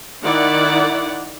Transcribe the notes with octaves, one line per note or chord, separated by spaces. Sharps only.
D#3 E4 D5 F#5